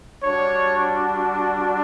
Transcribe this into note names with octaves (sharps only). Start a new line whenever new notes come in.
G3 D4 F#4 C#5